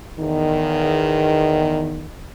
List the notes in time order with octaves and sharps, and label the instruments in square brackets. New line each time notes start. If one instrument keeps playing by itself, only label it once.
[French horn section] E2 D#3